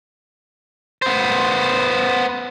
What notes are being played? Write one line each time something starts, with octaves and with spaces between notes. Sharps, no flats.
B3 C5